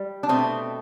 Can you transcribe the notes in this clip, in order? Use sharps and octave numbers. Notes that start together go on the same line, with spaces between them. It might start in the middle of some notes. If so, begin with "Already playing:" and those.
Already playing: G3
D4
B2 A3 C4